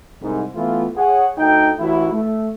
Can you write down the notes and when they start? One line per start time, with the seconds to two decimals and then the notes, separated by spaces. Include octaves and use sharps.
0.22 C2 G#2
0.55 E3 A3 B3 F4
0.96 G#4 C#5 F#5
1.38 D2 D#4 A4 G5
1.79 A1 E4 F#4
2.12 A3